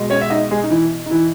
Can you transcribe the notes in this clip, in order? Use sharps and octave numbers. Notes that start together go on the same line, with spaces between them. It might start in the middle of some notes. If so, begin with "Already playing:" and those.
Already playing: B2 G#3
C#4 C#5
E5
D#4 D#5
G#3 G#4
D#4
E3 E4
D#4
E3 E4